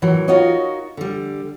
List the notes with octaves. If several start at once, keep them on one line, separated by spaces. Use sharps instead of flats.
A2 E3 F#3 A#4
D#4 F4 F#4 A#4 C#5 D#5
D3 G3